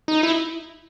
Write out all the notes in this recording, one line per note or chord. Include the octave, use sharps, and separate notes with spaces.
D#4
E4